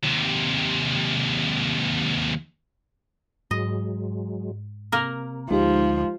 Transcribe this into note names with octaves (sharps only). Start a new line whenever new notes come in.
D#2 C3
G#2 F#3 G#3 D#5
C3 A#3 A#4
D2 F3 G#3 D#4 G4